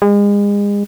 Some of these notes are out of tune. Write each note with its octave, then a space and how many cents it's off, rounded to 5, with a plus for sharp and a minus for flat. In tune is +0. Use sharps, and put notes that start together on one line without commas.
G#3 -35